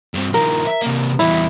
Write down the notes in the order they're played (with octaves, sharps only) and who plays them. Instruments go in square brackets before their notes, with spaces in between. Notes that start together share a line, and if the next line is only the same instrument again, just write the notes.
[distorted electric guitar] G2 C4
[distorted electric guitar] D#3 F3 [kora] A#4
[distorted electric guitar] E5
C3 A#3
[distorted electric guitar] E2 G3 [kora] E4